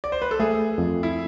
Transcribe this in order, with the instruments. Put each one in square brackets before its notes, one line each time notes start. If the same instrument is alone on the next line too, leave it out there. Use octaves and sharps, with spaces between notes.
[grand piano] D5
C5
B4
A4
[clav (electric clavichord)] A3 [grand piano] G#4
[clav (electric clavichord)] F2
[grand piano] E4